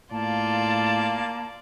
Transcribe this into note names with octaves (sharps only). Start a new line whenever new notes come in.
A2 A#3 F4 D5 A5